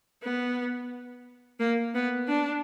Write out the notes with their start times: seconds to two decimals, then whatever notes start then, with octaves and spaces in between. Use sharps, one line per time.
0.23 B3
1.60 A#3
1.95 B3
2.28 D4